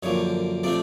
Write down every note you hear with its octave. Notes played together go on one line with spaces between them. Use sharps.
F#2 D3 F3 A#3 C#5
C3 F3 A3 D4 D5